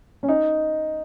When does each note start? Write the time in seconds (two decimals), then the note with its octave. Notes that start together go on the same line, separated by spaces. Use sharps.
0.23 C#4
0.29 D#4